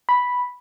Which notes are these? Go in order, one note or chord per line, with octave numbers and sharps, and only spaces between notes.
B5